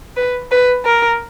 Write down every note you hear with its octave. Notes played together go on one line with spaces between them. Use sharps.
B4
B4
A#4